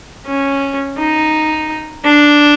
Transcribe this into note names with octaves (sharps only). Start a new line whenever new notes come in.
C#4
D#4
D4